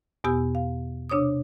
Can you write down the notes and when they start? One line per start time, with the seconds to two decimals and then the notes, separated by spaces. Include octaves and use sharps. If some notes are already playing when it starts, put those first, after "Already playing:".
0.24 E2 B2 B3 G4 G#5 E6
0.55 F5
1.10 C3 D4 C#5 D6 D#6